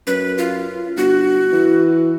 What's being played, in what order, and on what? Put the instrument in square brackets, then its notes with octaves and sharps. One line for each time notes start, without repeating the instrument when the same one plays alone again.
[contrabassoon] F#2 [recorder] B4
[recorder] F4
[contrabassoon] G1 [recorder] F#4
[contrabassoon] E3